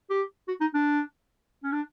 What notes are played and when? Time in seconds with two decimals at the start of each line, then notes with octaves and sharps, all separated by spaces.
0.10 G4
0.48 F#4
0.61 D#4
0.74 D4
1.63 C#4
1.72 D4